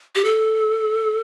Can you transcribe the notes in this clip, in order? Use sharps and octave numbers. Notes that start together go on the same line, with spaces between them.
G4
A4